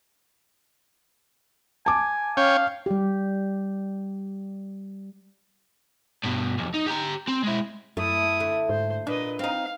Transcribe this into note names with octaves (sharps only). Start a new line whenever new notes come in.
G#5 A5 D6
C#4 C#5 F5 G5
G3 G4
G2 B2
B1 F2
D#4
G4 A#5
C4
G#3 E4
F#2 A3 E4 D#6
D2 A3
G#2 C5
A#2 D4 B4 D#5
C4 D#4 F5